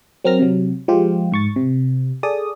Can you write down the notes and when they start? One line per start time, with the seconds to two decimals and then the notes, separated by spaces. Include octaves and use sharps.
0.24 F#3 C4 A#4 F6 A#6
0.39 C3 F#3
0.88 F3 G#3 F4 G4
1.32 G#2 C#6 A6
1.56 C3
2.23 G#4 A4 D5 D#6